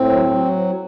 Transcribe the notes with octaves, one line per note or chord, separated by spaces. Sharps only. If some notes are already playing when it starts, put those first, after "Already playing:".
Already playing: A2 C4
F#3
F#3